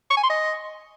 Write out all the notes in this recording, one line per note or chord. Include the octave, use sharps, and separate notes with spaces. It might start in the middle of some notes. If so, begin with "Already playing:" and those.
C#6
G#5
C6
D#5